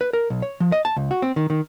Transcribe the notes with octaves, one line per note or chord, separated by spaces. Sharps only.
B4
A#4
B1
C#5
F3
D#5
A5
C#2
F#4
C4
D#3
D#3